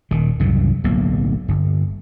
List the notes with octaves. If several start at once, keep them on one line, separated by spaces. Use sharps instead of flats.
D#1 D#3
C2 F#2 A2 C#3
D1 B1 A#3
G1